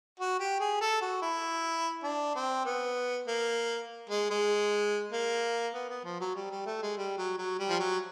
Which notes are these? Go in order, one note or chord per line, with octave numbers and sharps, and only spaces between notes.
F#4
G4
G#4
A4
F#4
E4
D4
C4
B3
A#3
G#3
G#3
A#3
B3
B3
F3
F#3
G3
G3
A3
G#3
G3
F#3
F#3
G3
F3
F#3